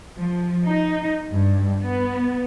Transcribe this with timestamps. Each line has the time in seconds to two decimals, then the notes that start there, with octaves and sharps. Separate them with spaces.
0.17 F3
0.65 D#4
1.30 G2
1.81 B3